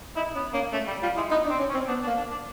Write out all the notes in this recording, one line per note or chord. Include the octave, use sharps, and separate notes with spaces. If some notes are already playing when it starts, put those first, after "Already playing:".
D#4 E4
B3 C#4
A#3 C#4
A3 C#4
G3
G3 F4
G#3 E4
B3 D#4
D4
C4
C#4
C#4
C4
B3 D4
D4
A#3
D4
D4